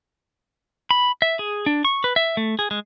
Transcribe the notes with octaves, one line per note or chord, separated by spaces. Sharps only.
B5
E5
G#4
D4
C#6
B4
E5
A3
G#4
G#3